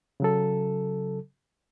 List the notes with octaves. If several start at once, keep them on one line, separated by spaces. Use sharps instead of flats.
C#3 F#3 A4